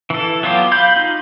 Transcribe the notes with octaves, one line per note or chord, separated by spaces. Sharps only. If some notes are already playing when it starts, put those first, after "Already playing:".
E3 A4
F#3 B3 F4 G4
F5 B5 G6
D#4 F4